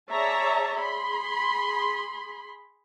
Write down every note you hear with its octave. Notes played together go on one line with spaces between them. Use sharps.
G#4 C#5 D5 E5 A5 A#5
G#4 B5 C6